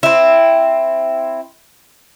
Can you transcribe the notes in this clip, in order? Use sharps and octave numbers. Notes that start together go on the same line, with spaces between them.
C4 E4